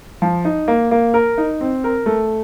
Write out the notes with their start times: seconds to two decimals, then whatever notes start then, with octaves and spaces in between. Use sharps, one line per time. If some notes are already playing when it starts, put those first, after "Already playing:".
0.22 F3
0.45 D#4
0.68 A#3
0.91 A#3
1.14 A#4
1.38 D#4
1.61 C4
1.84 A#4
2.06 A3